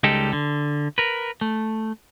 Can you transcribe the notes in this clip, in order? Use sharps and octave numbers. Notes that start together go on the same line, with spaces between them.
C#2 G3 G#3 D#4 G4 A4
D3
A#4 B4
A3